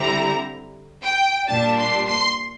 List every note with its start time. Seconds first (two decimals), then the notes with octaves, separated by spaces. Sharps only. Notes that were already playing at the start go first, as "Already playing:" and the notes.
Already playing: D3 G3 C4 E4 A#5
1.02 G5
1.47 A#2 G3 D4 A5
1.78 C6
2.07 C6